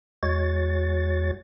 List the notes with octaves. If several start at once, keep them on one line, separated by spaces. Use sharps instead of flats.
E2 G#3 F#4 C#5 A6